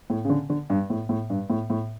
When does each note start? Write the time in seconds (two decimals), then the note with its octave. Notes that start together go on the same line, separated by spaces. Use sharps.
0.10 A2
0.25 C#3
0.29 D3
0.50 D3
0.70 G2
0.90 A2
1.09 A2
1.30 G2
1.50 A2
1.70 A2